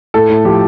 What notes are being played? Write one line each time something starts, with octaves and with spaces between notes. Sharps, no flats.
A2 A4
A2
F3 G4